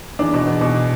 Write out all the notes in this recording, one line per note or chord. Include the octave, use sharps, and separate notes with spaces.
E2 D4
B2
E2
B2